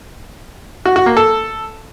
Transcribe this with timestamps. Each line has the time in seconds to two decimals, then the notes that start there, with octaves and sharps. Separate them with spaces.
0.85 F#4
0.96 F#4
1.06 A#3
1.17 A4